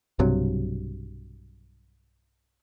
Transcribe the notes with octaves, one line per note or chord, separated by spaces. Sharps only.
B1 G2 C3 F#3